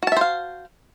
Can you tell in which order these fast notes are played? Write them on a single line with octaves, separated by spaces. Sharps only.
F#4 A5 E5 C5 F5